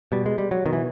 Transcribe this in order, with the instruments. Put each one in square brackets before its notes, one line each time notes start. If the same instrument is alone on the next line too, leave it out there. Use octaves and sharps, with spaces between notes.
[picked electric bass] B2 G3
G#3
G3
F#3
B2 D#3
E3